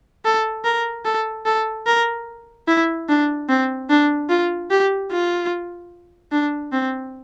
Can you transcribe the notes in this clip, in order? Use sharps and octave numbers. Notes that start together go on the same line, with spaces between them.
A4
A#4
A4
A4
A#4
E4
D4
C4
D4
F4
G4
F4
D4
C4